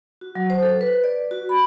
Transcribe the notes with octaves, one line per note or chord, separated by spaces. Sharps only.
F#4
F#3
C5
A4
B4
D5
F#4
B5